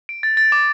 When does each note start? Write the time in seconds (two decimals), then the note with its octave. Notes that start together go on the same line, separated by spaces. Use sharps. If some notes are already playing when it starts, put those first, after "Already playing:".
0.09 D7
0.23 A6
0.37 A6
0.52 D6